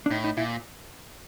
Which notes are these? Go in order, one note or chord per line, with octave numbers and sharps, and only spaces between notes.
D4
A2 D#4
D#4
A#2 E4